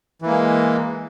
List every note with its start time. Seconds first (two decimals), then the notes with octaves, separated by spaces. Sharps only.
0.22 E3
0.26 A#3
0.30 G#3